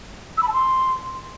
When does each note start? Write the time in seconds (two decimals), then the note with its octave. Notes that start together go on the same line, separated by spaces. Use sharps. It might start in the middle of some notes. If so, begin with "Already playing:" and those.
0.37 E6
0.43 B5
0.48 A5
0.53 C6